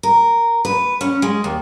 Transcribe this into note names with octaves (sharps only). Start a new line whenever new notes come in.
A#4
B4
C#4
G#3
D#2